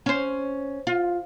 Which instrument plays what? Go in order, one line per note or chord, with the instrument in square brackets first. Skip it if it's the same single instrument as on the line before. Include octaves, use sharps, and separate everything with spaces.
[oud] C#4 C5
F4